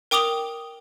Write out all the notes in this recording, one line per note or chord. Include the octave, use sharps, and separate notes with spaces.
A#4 G5 D6 D#6 F7 G7